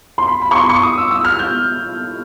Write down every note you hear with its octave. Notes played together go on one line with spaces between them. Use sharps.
C6
B5
B5
C#6
C6
C#6
D#6
E6
E6
F6
G6